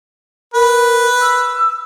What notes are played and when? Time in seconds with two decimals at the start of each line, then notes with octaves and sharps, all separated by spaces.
0.54 A#4 B4
1.21 E6